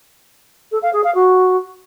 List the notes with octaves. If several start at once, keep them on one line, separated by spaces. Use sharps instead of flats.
A4
F5
G#4
F5
F#4